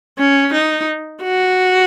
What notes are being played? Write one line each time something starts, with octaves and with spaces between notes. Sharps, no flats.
C#4
D#4
F#4